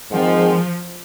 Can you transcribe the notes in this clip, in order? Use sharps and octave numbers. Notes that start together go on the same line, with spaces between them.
G#2 D#3 F3 G#3 C4